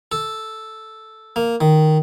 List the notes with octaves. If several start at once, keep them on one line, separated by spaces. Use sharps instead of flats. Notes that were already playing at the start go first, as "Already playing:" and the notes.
A4
A#3
D#3